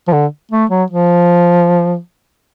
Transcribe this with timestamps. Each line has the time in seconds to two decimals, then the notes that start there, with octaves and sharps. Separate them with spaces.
0.08 F3
0.13 D3
0.51 A3
0.70 F#3
0.90 F3